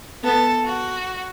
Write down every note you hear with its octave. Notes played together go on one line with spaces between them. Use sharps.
B3 A4
F#4